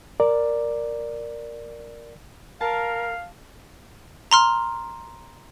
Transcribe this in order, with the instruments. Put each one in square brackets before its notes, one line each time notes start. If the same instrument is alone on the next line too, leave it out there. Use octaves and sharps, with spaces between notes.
[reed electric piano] A#4 D5
[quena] A#4 [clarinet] F5 [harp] A5
[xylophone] A#5 C6 F6